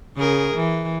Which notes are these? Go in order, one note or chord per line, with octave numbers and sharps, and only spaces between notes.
C#3 G#4 A#4
E3